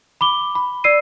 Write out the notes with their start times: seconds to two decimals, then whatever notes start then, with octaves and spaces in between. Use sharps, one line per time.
0.21 B5 D6 G7
0.55 B5
0.84 D5 E6 C7 D#7